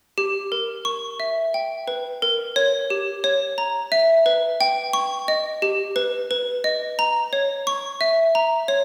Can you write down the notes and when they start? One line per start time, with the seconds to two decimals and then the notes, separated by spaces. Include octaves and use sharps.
0.18 G4
0.52 A#4
0.85 C#6
1.20 E5
1.54 G5
1.88 B4
2.22 A#4
2.56 C#5
2.90 G4
3.24 C#5
3.58 A#5
3.92 E5
4.26 B4
4.61 G5
4.93 C#6
5.28 D#5
5.62 G4
5.96 B4
6.31 B4
6.64 D#5
6.99 A#5
7.33 C#5
7.67 C#6
8.01 E5
8.35 A#5
8.68 C#5